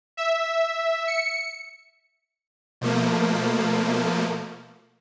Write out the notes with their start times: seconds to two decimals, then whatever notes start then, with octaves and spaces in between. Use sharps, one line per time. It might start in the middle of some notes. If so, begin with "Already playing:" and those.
0.17 E5
1.07 C#7
2.81 B2 F3 A3 A#3